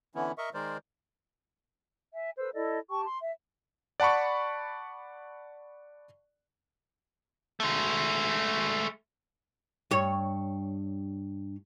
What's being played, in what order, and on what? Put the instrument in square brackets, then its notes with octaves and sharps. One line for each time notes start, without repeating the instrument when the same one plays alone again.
[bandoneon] D3 E3 B3 C#4 E4
A#4 D#5 E5 C#6
D#3 G#3 A#4 C5 D5
[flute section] E5 G#5
A4 B4 C5 E6
E4 A4 D5 D#5
G4 G5 A5 C#6
C6
E5
[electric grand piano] D5 F#5 A5 B5 C#6
[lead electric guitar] G#3 A3
[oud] G2 C#5